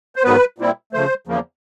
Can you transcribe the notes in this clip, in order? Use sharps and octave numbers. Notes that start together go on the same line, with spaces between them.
C5
G#2 D#3 F#3 B3 B4
A#2 G3 C4 E4
C#3 F3 A3 C5
E2 C#3 F3 A#3